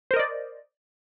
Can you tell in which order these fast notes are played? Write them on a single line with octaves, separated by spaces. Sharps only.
C5 A#4 D#5 D5